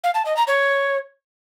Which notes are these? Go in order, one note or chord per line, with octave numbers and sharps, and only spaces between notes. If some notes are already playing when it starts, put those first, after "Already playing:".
F5
A5
D#5
A#5
C#5